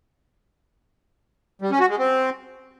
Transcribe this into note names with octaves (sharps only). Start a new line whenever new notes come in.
G3
C#4
F#4
G#3
C4